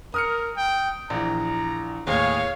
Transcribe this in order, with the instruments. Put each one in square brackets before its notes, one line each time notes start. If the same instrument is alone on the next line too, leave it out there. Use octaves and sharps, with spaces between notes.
[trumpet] A#4 [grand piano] D#6 F6 C#7
[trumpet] G5
[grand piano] A#1 E3 [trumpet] A#5
[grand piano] D#2 A2 [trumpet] G#4 [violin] C#5 F5